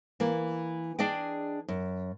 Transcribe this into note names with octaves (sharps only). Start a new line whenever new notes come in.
E3 A#3
D4 G#4 D5 D#5 G5
F#2